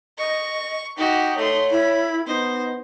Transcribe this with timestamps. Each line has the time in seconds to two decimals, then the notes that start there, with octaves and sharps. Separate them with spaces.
0.18 D#5 C#6
0.98 D#4 F#4 G4
1.37 A3 C#5 C6
1.71 E4 B5
2.27 B3 D#4 C5